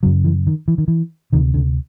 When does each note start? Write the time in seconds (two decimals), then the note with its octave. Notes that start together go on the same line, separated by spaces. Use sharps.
0.03 F#2 C#3 F#3
0.24 E3
0.47 D#3
0.68 E3
0.78 D#3
0.88 E3
1.32 D2 C3 D#3
1.54 D3